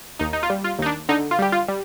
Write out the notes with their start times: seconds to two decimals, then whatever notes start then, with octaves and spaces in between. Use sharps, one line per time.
0.19 D#2 D#4
0.33 D#4
0.43 F4
0.50 G3
0.64 F4
0.79 D#2 D#4
0.86 D4
1.09 D3 D#4
1.31 F4
1.39 G3 G4
1.52 F4
1.68 G3